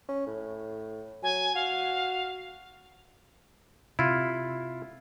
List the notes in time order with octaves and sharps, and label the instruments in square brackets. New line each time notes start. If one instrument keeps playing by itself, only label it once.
[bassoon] C#4
A2
[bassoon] F#3 [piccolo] G#5
[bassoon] F#4 [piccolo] F5
[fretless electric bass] C3 [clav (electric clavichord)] E4 F4